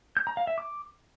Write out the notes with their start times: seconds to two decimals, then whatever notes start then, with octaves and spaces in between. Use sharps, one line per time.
0.17 G6
0.27 A#5
0.37 F5
0.47 E5
0.58 D6